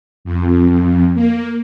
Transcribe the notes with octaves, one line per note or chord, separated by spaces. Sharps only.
F2
F2
A#3